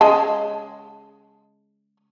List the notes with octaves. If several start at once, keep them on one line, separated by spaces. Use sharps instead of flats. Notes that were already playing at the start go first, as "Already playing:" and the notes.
C#3 G#3 A5